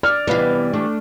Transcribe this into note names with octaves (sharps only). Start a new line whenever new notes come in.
D5 F6
C3 E3 G3 B3 D5 F5
A3 D4